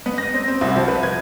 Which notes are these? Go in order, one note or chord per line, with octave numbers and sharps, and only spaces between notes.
B3
A#6
C4
C4
C2
F3
B4
G#6